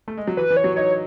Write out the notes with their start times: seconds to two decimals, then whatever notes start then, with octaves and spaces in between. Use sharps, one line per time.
0.08 A3
0.17 G#3
0.27 F#3
0.37 E3 B4
0.50 E3
0.57 C#5
0.64 F#3
0.76 D#4 C#5